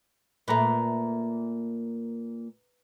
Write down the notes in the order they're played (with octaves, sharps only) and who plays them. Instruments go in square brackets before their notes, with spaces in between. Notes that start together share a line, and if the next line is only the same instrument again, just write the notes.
[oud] A#2 A3 [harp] B4 A#5